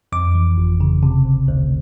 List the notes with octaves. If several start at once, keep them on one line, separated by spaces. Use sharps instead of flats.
F2 D6
E3
G1
C#3
C3
D2
D2